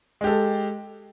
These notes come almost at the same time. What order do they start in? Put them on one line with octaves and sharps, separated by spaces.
G#3 G4 A4